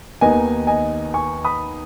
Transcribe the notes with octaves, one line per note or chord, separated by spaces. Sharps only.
D#2 D#3 B3 D#4 D#5 G#5
D#5 G#5
G#5 C#6
B5 D#6